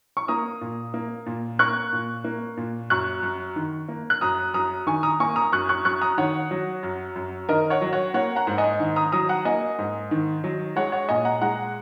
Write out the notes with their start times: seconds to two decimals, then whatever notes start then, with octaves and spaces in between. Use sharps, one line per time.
0.17 C#6
0.28 A#3 A#5 D#6
0.61 A#2
0.94 A#3
1.26 A#2
1.59 A#3 C#6 F#6
1.93 A#2
2.24 A#3
2.57 A#2
2.90 F#2 C#6 F#6
3.23 F#2
3.56 D#3
3.88 A#3
4.10 F#6
4.21 F#2 A#5 D#6
4.54 F#2 A#5 D#6
4.87 D#3 G#5 C#6
5.03 A#5 D#6
5.20 A#3 G#5 C#6
5.36 A#5 D#6
5.52 F#2 C#6 F#6
5.69 C#6 F#6
5.85 F#2 C#6 F#6
6.01 A#5 D#6
6.17 D#3 C#5 F#5
6.51 F#3
6.83 F#2
7.16 F#2
7.49 D#3 A#4 D#5
7.70 C#5 F#5
7.81 F#3
7.93 C#5 F#5
8.14 A#3 C#5 F#5
8.36 F#5 A#5
8.47 G#2
8.58 D#5 G#5
8.80 D#3
8.96 A#5 D#6
9.12 F#3 A#5 D#6
9.29 F#5 A#5
9.45 A#3 D#5 G#5
9.79 G#2
10.11 D#3
10.44 F#3
10.76 G#3 C#5 F#5
10.92 C#5 F#5
11.09 A#2 D#5 G#5
11.25 F#5 A#5
11.42 G#3 F#5 A#5